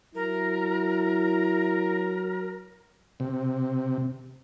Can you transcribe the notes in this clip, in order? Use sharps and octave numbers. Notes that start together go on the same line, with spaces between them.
F#3 E4 A#4
C3